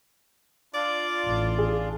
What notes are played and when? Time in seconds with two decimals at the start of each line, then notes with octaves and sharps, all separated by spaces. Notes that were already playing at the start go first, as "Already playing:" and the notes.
0.74 D4 F4 D5
1.26 A1
1.58 G#4